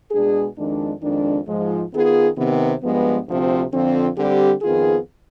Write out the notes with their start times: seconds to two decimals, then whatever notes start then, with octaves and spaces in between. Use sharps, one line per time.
0.11 B2 G#3 D4 G#4
0.57 F2 D#3 G#3 D4
1.02 F2 D#3 G#3 D4
1.47 G#2 F3 G#3
1.92 D#3 B3 F4 G#4
2.37 C3 D#3 B3
2.82 G2 F3 G#3 B3
3.27 D2 C3 F3 C4
3.72 F2 D3 F3 C4
4.17 D3 G3 C4 G4
4.62 F2 D#3 B3 F4 G#4